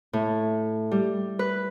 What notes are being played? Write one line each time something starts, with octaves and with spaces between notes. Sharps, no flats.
A2
G3
B4